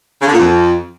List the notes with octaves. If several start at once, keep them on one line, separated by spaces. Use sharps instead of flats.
C#3
D3
A#2
F2